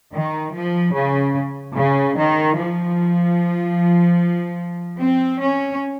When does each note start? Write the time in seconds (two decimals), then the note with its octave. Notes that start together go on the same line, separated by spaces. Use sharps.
0.13 D#3
0.54 F3
0.94 C#3
1.75 C#3
2.15 D#3
2.57 F3
4.99 C4
5.40 C#4